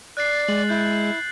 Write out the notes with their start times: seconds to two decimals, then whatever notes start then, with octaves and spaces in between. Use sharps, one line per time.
0.17 D5 F#6 A6 C7
0.48 G#3 F#7
0.69 E4 F#6 G6